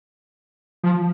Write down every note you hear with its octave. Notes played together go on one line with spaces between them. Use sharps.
F3